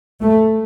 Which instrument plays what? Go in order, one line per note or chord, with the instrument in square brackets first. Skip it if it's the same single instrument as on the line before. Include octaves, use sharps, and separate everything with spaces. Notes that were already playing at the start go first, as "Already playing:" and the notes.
[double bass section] A3